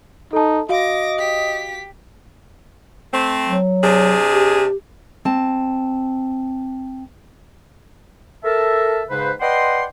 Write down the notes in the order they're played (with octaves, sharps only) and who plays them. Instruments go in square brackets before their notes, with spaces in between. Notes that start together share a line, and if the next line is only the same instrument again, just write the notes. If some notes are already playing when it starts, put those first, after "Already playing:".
[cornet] D#4 [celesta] A4 A5
[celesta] F#4 F5 [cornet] D#5 [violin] D6 A#6
[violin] G4 B6
[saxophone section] A3 C4
[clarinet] F#3
[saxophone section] C3 D4 G#4
[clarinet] G4
[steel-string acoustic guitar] C4 A5
[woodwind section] A4 A#4 E5 A5
G#2 C#3 B4 C5
B4 D5 D#5 F#5 G5 C6